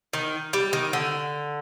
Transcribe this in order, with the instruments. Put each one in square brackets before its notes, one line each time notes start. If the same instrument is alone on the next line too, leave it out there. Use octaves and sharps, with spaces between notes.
[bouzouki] D#3
G3
D#3
D3